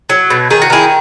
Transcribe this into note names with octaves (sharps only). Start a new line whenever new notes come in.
F#3
B2
D#3 G#4
F#4
D#3 E4 G#4